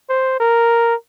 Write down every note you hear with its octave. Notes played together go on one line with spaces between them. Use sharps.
C5
A#4